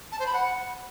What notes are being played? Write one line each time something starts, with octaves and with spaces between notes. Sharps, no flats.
A5
C5
B5
F#5